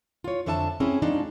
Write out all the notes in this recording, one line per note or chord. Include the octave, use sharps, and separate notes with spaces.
F4 C#5
F2 D3 D4 E5 G#5 A5
C4 C#4 E4 G#4
F3 G#3 D4 D#4